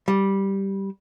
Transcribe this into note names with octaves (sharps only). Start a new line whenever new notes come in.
G3